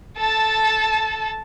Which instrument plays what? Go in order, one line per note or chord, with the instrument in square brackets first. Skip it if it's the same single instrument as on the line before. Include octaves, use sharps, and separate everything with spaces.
[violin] A4 A5